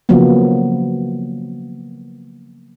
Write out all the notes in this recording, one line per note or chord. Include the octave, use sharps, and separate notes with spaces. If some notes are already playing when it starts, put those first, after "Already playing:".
C#3 F3 F#3 A#3 B3